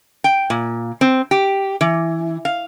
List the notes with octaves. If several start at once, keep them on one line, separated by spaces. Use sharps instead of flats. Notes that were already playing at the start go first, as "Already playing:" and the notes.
G5
A#2
C4
G4
E3
F5